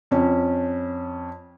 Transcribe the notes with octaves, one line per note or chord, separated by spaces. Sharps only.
F2 C#4